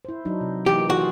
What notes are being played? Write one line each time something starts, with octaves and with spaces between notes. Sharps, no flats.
E4 C5
F#3 D4 D#4
C3
E3 A#3 D#4 G4
E3 F4 F#4 G#4